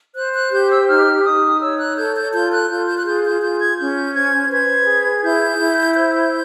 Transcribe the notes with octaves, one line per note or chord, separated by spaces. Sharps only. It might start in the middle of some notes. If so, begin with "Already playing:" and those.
C5 F#6
F#6
G4 G6
E6
D#4 F6
D#4 D#6
C#5 E6
F#6
A4 G6
G6
F4 G6
F#6
F4 G6
G6
F#6
G#4 G6
G6
F4 G6
G#6
C#4 G6
C5 G#6
B4 G#6
G#4
E4 G6
E4
C5 G6